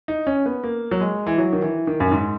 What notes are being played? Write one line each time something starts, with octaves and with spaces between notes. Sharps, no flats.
D#4
C#4
B3
A#3
F#3
G#3
E3
F#3
D#3
E3
D#3
F#2
G#2